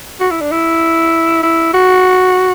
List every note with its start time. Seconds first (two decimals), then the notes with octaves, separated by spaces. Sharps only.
0.20 F#4
0.31 E4
0.41 D4
0.51 E4
1.43 E4
1.73 F#4